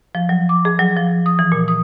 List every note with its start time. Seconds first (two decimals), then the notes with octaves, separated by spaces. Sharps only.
0.15 F3
0.29 F#3
0.49 D6
0.65 G#4
0.79 F#3
0.97 F3
1.26 D#6
1.39 E3
1.52 A#2
1.68 D#6